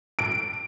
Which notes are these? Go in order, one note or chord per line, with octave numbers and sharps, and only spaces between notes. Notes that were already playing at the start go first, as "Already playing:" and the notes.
D7